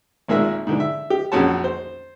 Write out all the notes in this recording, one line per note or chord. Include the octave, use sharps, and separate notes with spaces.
G#1 A#2 G#3 A#3 E5
G#2 D3 E3
E5
G4
A#1 F2 C#4 F#4 C#5 A5
C5